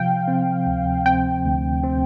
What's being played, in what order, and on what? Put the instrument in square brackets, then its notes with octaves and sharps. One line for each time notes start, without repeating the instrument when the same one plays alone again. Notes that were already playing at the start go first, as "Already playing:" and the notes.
Already playing: [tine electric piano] C3 F3 [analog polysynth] F5 G5
[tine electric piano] C4
D2
[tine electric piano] C4 [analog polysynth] G5
[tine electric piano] D2
C4